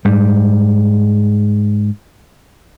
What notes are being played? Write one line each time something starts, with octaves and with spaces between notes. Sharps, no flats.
G#2 G3